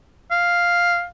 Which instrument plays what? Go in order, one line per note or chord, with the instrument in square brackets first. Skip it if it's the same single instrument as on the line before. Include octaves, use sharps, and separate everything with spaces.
[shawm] F5